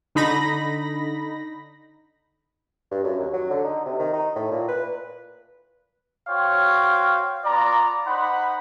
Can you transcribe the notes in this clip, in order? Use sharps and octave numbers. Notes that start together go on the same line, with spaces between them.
D3 D#4 B5 A#6
G2
F#2
D#2
F#3
D3
D#4
C3
D#3
D#4
A2
A#2
B4
F#4 C5 C#5 F5 G5
B3 F4 D5 A#5
D#4 C5 F#5 B5